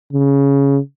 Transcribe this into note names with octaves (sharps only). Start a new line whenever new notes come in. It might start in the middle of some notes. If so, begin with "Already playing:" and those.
C#3